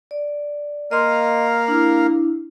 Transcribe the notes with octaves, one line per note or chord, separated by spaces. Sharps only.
D5
A#3 A#4 D#5 F5 C6
D4 E4